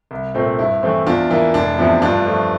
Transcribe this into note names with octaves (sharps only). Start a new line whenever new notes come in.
C2
A#2 A3 C4
G2 E4
E3 A3 C4
E2 D4 F4
E3 A#3 E4
F1 D4
E2 C3 F3 E4
G2 D4 F4
F3 A3